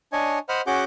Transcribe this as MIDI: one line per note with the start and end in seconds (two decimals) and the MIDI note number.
0.13 0.39 62
0.13 0.39 73
0.13 0.39 75
0.13 0.39 80
0.49 0.61 72
0.49 0.61 75
0.49 0.61 78
0.49 0.61 83
0.49 0.61 89
0.67 0.85 61
0.67 0.85 66
0.67 0.85 68
0.67 0.85 78
0.67 0.85 86
0.67 0.85 91